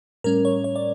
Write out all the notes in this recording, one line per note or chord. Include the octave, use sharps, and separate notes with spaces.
A2 G3 C#4 A#4
C#5
C#5
D5